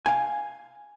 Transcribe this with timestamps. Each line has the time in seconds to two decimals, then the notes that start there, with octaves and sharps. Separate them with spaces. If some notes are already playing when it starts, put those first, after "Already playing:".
0.06 F5 G#5